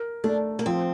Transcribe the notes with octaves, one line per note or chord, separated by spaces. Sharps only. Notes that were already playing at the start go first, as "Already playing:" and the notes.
Already playing: A#4
A3 D4
A#3
F3 C4